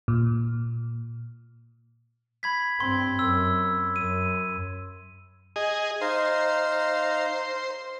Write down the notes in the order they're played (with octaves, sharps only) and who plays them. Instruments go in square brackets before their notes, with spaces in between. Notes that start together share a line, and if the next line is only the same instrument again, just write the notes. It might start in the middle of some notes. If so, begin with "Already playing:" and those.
[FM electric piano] A#2
[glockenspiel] B5 G#6 B6
[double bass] G2 C4 [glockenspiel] C6
[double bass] F#2 [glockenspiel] E6
[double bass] F#2 [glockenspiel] D#7
[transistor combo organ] G#4 D#5
[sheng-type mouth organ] D#4 F5 A#5 [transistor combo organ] C5